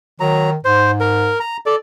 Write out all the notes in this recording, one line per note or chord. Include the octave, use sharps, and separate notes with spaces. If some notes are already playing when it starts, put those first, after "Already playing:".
D#3 F#3 A#5
G#2 C5
A#4
A#5
A4 D5